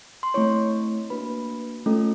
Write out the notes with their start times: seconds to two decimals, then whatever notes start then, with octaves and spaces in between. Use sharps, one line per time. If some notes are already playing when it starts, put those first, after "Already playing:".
0.23 C6
0.34 A3 C4 E4 C#5 C#6
1.10 A#3 D4 F#4 B4 B5
1.86 A3 C#4 F4 A4